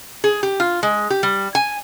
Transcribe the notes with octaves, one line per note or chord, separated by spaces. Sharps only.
G#4
G4
F4
G#3
G4
G3
G#5